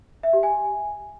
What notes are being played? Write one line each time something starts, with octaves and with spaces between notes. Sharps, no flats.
E5
G4
G#5